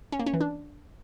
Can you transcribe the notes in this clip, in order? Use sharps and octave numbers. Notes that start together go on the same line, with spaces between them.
C#4
A#3
C#4
E3
D4